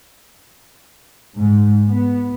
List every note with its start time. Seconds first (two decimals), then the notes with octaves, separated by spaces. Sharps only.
1.37 G#2
1.87 B3